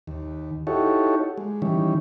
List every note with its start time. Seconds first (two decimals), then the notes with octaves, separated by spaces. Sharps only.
0.07 D#2
0.67 D#4 E4 F#4 G4 A4 C#5
1.38 G#3
1.62 D#3 E3 G3 C#4